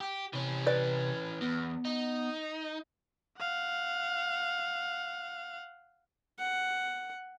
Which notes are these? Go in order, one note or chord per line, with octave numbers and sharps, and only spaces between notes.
G4
C3 E3 C#4
B4 D5
E2 B3
D#4
F5 F#5
F#5